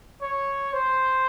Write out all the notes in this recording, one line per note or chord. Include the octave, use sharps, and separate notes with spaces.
C#5
C5